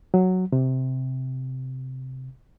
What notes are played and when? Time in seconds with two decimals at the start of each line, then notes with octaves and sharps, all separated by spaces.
0.14 F#3
0.52 C3